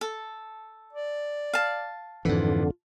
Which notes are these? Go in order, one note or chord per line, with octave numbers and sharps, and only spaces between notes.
A4
D5
F5 A5
F2 G#2 D3 E3 F4